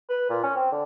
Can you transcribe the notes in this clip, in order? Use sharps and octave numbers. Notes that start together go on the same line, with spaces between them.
B4
A#2
C#4
C4
D3